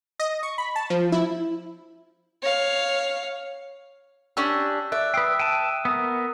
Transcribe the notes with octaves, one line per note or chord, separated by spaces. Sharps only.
D#5
C#6
B5
A5
F3
E4
C#5 F5
C#4 D4 G4 E6
D5 E5 F#6
B4 G5 D#6 E6 C7
G5 A5 D#7
B3 A#4 D#6